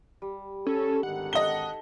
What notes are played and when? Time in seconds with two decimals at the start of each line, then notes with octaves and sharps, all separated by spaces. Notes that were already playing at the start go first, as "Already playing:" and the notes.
0.22 G3
0.67 C#4 A4
1.03 G#1 D3 D#3 F#5
1.33 D#4 A4 D#5 G7